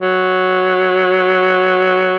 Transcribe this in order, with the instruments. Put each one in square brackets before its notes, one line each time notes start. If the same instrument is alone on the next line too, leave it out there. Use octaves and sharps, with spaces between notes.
[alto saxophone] F#3